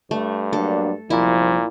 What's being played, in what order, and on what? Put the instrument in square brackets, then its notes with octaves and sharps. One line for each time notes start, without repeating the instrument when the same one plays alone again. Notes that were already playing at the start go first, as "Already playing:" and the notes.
[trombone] G2 [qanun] A3
[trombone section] F#3 A#3 D4 [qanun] A4
[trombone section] C2 F#2 F3 [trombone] A#2 [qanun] E4